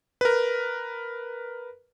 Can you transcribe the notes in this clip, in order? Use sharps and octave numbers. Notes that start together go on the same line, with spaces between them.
A#4 B4